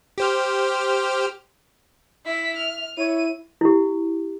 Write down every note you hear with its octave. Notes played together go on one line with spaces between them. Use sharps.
G4 C5 F6
E4 E5 B6
F6
E4 C#5 D#7
E4 G4